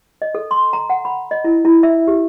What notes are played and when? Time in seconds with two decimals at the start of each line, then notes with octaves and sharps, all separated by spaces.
0.22 D#5
0.35 A4
0.51 C6
0.73 A#5
0.90 F#5
1.05 B5
1.31 D#5
1.44 E4
1.65 E4
1.83 E5
2.07 G4